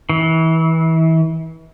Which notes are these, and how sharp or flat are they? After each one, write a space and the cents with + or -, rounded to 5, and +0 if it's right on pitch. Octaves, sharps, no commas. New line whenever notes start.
E3 -30